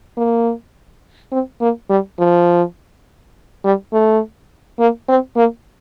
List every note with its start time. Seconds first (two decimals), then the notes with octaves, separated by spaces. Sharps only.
0.17 A#3
1.32 C4
1.61 A#3
1.89 G3
2.19 F3
3.64 G3
3.93 A3
4.79 A#3
5.08 C4
5.36 A#3